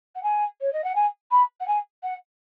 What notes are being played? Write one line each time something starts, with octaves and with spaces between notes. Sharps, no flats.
F#5
G#5
C#5
D#5
F#5
G#5
B5
F#5
G#5
F#5